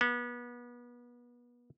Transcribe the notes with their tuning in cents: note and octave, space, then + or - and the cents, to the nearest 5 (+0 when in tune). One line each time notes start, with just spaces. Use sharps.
B3 -30